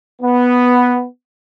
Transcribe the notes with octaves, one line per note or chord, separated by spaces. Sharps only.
B3